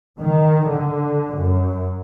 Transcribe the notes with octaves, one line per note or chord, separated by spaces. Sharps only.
D#3
D3
F#2